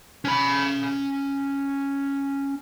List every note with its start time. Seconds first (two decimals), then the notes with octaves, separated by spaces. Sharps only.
0.25 C#4 B5